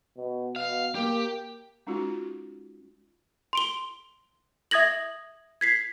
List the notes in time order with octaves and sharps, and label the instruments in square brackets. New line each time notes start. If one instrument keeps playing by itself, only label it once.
[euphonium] B2
[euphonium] B2 [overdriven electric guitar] F5
[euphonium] A#3 [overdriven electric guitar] G4
[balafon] G#3 C#4 D#4 F4 F#4
[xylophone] C6 D7 G7
E5 D#6 G#6 A#6 F#7
G#6 B6 C7